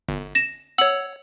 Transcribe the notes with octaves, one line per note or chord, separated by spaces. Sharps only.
G1
A#6 E7
C#5 F#5 E6 F#7